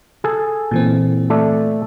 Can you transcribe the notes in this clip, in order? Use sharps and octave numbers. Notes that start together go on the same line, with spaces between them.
G#4 A4
A#2 E3 C4
A3 A4 D5